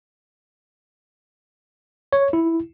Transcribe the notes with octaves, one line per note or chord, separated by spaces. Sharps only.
C#5
E4